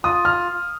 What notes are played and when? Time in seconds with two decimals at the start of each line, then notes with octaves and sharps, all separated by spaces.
0.04 F4 D#6
0.25 F6